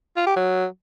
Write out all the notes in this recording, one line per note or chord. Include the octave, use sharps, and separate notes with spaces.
F4
G4
F#3